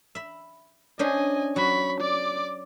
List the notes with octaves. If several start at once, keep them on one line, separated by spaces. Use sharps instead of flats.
E5 B5
C#4 D4 C5 D#5 G#5
F#3 F#4 B5 C#6
D5 D6